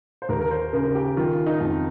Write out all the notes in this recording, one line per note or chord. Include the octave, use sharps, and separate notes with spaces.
C5
D#2 A#4
A#4
C5
C#3 A#4
G4
D#3 F4
D#4
F2